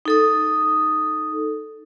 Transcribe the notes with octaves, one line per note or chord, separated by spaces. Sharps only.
D#4 A4 D#6